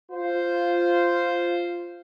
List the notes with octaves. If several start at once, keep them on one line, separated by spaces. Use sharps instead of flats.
F4 C5